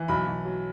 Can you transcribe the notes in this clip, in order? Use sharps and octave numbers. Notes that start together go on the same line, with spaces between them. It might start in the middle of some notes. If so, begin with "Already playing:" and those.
Already playing: E3
B1 B5
B1
F#3